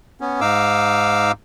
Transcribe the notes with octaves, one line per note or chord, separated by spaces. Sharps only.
B3 C#4
G#2 D#4 F5 D6 E6